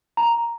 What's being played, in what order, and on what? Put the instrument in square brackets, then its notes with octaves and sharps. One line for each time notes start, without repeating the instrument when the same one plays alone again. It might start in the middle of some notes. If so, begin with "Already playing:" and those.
[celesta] A#5